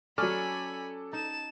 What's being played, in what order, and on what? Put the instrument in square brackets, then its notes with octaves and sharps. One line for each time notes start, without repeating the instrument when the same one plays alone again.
[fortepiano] F#3 F6 [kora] C#4 [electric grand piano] A4 D5 D6 [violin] G#5 B5
[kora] D#4 [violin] A5 E7